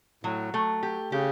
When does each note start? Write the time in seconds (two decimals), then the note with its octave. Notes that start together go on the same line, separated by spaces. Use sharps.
0.24 A2 F#3
0.54 A3
0.83 G4
1.12 C#3 G4